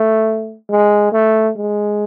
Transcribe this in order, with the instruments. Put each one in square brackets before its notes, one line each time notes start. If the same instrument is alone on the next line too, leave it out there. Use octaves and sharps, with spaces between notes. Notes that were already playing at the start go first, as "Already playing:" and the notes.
Already playing: [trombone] A3
G#3
A3
G#3